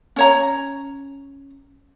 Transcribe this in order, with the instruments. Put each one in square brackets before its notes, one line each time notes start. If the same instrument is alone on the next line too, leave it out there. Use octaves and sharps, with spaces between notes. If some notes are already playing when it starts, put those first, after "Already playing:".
[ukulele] C#4 C#5 A#5